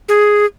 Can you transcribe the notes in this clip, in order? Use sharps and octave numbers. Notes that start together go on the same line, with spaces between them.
G#4